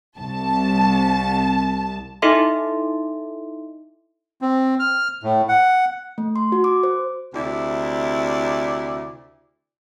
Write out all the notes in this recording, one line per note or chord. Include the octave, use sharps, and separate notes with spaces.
C2 A5
D#4 E4 A4 D#5 E5 C6
C4
F6
A2
F#5
A3
C6
F#4
D6
C5
D2 C3 E4 D5